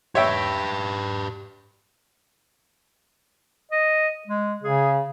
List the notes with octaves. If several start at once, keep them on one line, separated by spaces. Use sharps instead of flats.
G4 B4 C#5 E5 G5
D#5
G#3
C#3 G#4